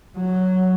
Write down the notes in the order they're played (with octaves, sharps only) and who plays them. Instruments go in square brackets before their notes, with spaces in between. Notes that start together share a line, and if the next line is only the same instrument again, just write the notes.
[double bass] F#3